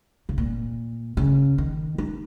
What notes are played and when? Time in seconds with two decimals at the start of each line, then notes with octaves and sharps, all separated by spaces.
0.29 C#3
0.38 A#2
1.17 C#3
1.58 D#3
1.98 D#4